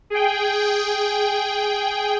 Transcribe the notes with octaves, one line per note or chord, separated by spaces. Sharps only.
G#4 G5